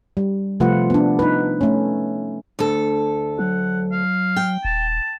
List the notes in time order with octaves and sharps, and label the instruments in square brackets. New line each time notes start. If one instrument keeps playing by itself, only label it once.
[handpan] G3
C3 F3 A3 F4 B4 F#5
B3 D4
D#4 B4
A3 C#4
[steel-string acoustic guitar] D2 A4
[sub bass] F#3 [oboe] F#5
[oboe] F5
[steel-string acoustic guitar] G5
[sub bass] D#1 [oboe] A5